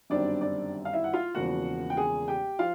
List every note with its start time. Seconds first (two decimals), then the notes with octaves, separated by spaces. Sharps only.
0.10 G1 F#2 D#3 G3 C4 D4 D5
0.41 D4 D5
0.85 F5
0.93 E4 E5
1.04 F#5
1.13 F4 F5
1.35 E1 E2 C#3 F3 A#3 F#4 F#5
1.90 G5
1.97 G#4 G#5
2.28 G4 G5
2.59 F3 F4 F5